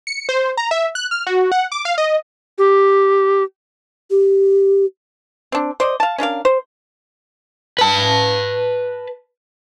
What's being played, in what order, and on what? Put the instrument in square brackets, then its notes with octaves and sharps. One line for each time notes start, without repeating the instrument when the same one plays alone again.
[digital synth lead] C#7
C5
A#5
E5
F#6
F6
F#4
F#5
D6
F5
D#5
[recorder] G4
[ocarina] G4
[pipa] C4 D4
C5 D5 D#5
F5 A5
C#4 D4 A#4 F5
C5
[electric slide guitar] B4 A5